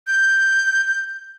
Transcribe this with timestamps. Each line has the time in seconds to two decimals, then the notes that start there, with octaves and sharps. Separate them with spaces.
0.07 G6